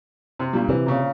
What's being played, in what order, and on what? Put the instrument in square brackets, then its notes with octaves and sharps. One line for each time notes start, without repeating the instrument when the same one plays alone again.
[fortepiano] C3 C4
G2 A#2 G3
[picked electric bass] C3 [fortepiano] E3
[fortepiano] A#2 C#3